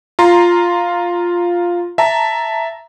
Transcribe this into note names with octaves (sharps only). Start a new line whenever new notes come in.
F4 A#5 C6
E5 A5 A#5